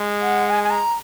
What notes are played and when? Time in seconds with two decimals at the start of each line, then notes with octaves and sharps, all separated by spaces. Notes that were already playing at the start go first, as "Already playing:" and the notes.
Already playing: G#3
0.21 F#5
0.50 G#5
0.63 G#5
0.70 A#5